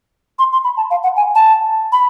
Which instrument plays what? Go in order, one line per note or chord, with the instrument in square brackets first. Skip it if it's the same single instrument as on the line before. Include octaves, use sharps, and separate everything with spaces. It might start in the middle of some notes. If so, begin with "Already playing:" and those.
[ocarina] C6
C6
B5
A5
F5
F#5
G#5
A5
B5